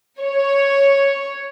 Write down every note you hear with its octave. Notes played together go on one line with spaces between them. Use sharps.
C#5